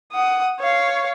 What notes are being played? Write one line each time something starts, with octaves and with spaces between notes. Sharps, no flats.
F#5 D#6
C#5 F5